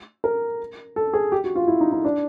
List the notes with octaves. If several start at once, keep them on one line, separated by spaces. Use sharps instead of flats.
A#4
A4
G#4
G4
F#4
F4
E4
D#4
D#4
D4